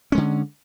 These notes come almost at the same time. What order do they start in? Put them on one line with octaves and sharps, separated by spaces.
C#4 G#3 D3